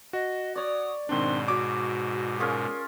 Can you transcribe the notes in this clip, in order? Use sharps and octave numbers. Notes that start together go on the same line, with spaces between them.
F#4 D#5
C#5 D5 D#6
G#2 B2 D#3 C4 D4 C6
F#4 C#5 D6
C#4 F4 G#4 A#4